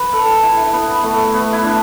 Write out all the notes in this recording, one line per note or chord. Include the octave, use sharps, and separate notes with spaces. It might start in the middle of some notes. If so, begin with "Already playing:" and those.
Already playing: B4
A4
E4
B3
A3
B3
E4
D4